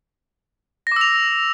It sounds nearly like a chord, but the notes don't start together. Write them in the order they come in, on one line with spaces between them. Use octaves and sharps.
A#6 D6 E6 F7